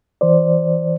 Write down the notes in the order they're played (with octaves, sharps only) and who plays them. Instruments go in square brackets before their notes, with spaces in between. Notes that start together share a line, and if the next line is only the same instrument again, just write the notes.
[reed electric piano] E3 C5 D5